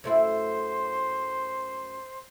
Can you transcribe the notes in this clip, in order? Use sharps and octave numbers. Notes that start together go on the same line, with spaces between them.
F#2 A3 E4 C5